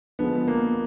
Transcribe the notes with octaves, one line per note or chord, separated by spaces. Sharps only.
D3 F3 G#3 B3
A#3